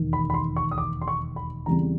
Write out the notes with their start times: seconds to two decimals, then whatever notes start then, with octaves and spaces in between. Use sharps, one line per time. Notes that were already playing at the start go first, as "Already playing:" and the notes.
Already playing: E1 D#2 D#3
0.13 B5
0.30 B5
0.34 C6
0.57 C#6
0.71 D#6
0.78 D6
1.01 C6
1.08 C#6
1.36 B5
1.66 E2 C#3 E3 G3 C4 A#5